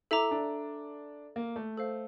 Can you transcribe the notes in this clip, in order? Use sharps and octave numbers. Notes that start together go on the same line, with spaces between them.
E4 A4 E5 A#5 D6
D4
A#3
A3
A4 C5 F5